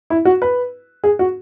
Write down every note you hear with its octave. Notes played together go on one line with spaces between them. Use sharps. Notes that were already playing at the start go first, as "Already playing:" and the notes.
E4
F#4
B4
G#4
F#4